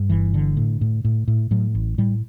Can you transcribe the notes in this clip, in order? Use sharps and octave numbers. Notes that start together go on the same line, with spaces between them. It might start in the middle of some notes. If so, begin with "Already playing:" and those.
Already playing: G2
G1 E3
D3
A2
A2
A2
A2
A2 F#3
A1
A2 G3